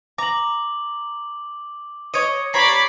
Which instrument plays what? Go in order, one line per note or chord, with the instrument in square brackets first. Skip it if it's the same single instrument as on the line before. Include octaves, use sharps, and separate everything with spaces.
[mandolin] A#5 [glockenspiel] D6 F#7
[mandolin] C#5 D#5 [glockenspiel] G#6 C#7 D#7
[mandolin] G4 C#5 A#5 [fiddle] D5 B5 [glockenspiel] C7